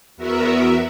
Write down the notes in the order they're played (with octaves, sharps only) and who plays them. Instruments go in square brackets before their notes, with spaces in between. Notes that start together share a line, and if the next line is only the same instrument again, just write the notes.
[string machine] E2 B3 F#4 A#4 E5